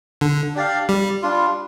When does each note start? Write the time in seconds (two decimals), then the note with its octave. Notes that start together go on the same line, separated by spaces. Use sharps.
0.21 D3
0.55 D4 G4 D5 F5
0.89 G3
1.22 G3 D4 F4